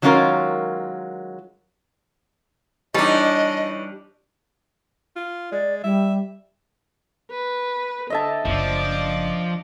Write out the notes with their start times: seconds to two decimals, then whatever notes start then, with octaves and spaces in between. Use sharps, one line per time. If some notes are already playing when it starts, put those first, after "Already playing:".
0.02 D#3 F#3 G#3 C#4 F4 A#4
2.94 E3 G3 D4 D#4 C#5 D#5 G#5 A5
5.16 F4
5.52 G#3 D5
5.84 G3 E5
7.31 B4
8.10 D3 D#5 E5 A5
8.45 F#1 C#3 F3 D4 D5